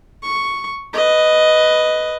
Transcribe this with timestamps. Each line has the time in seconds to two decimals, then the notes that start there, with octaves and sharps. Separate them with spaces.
0.23 C#6
0.93 B4 D#5